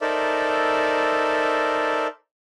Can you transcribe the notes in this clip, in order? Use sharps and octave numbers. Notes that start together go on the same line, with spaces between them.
D#4 A4 A#4 C5 D5 E5